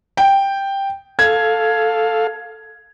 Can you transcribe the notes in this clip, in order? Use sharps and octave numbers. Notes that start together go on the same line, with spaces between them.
G5
A4 F5 G#6